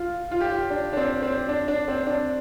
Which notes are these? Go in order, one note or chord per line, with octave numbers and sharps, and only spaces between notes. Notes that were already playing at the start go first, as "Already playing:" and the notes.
Already playing: F4
F4
G4
F4
D4
D4
C4
C4
D4
D4
C4
D4